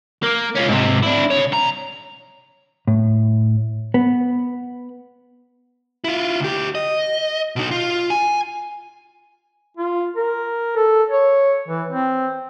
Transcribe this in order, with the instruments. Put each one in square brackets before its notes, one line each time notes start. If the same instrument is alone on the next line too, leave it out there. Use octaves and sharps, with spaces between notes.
[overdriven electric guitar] A#3
C#4 F4
G#2 C3
D4 E4
C#3 C#5
C2 A#5
[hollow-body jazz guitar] A2
B3
[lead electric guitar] E4 F4
D2 G4
D#5
B2 D#4
F4
G#5
[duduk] F4
A#4
A4
C#5
E3
C4